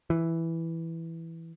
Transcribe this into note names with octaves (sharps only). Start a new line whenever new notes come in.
E3